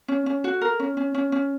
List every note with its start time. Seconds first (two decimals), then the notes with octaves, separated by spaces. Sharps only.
0.08 C#4
0.26 C#4
0.44 F#4
0.61 A#4
0.80 C#4
0.97 C#4
1.14 C#4
1.32 C#4